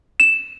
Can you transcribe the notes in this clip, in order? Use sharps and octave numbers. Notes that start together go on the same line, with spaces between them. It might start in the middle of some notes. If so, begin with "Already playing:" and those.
E7